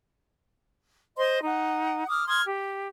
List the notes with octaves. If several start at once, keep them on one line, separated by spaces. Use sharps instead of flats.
C5 D#5 C6
D#4 F#5
D6 D#6 F6
C6 D#6 F6 G#6
G4